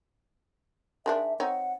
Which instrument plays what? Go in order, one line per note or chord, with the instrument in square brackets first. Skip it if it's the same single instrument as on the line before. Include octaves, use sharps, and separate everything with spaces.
[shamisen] D#3 G#3 D4 [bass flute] E5
[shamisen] C4 D#4 C#5 [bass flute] F#5